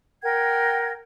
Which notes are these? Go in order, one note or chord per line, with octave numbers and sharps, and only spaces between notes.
A#4 F#5 G5 G#6